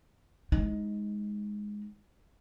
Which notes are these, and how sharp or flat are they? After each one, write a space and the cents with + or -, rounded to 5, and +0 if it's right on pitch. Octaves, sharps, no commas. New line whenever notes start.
G#3 +0 D#4 +15